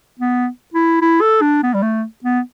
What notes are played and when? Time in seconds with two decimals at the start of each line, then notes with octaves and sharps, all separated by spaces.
0.20 B3
0.74 E4
1.02 E4
1.21 A4
1.42 D4
1.63 B3
1.74 G3
1.83 A3
2.24 B3